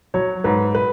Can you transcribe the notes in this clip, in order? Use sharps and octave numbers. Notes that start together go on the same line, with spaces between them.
F#3 C#5
G#2 B4
B4